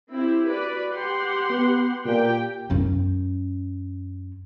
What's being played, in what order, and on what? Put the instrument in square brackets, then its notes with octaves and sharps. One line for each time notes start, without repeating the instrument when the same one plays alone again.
[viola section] C4 E4 G4
F#4 B4 D5
G4 F#5 C6
[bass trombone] B3
[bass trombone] A#2 [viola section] G4 G5
[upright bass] F#2 C#4